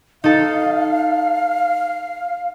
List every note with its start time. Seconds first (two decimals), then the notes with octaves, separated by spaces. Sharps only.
0.24 D#4 A4 F5